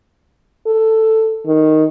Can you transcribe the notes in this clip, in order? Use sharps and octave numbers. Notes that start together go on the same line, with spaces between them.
A4
D#3